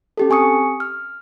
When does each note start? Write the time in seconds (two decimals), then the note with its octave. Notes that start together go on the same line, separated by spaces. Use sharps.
0.17 C#4 G4 A4
0.30 C4 G#5 C#6 D#6 C#7
0.80 F6